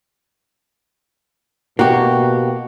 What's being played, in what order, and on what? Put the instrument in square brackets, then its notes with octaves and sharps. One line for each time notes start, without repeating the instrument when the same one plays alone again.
[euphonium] B2 [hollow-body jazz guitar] A#3 G4 [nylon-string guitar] F#4